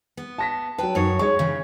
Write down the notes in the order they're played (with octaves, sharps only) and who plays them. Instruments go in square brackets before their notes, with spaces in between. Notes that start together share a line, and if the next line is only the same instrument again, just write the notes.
[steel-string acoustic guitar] B3
[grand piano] A5 A#6 B6
[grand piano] F#3 A5 [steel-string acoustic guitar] B4 G5
[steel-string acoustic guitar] F#2 D#4 C#5
[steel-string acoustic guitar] G#3 [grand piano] C#5 C#6
[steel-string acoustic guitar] C#3 E3